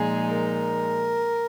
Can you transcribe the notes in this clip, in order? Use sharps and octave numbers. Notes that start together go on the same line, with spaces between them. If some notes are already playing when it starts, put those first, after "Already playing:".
Already playing: A#2 F3 G#3 D#4 G#4
A#4